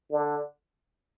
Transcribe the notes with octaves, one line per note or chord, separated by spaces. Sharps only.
D3